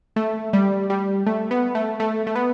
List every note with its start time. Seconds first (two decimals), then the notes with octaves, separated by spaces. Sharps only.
0.16 A3
0.53 G3
0.90 G3
1.26 A3
1.51 B3
1.75 A3
2.00 A3
2.27 A3
2.36 B3